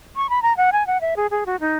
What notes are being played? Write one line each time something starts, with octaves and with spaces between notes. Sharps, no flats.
C#6
B5
A#5
F#5
G#5
F#5
E5
G#4
G#4
F#4
D#4